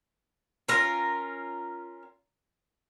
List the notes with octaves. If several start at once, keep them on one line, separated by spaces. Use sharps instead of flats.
C#4 F4 A#4